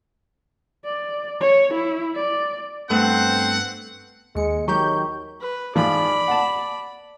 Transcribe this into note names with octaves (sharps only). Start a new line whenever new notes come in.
D5
C#5
E4
D5
G2 A3 B3 C4 F#5 F#6
D#2 G#3 C#7
D#3 F#3 G4 A#5 C#6 G6
B4
G#2 E3 F3 D5 B5
F#5 A5